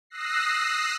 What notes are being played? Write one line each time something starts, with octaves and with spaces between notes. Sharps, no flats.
D#6 E6 F#6 A#6 C7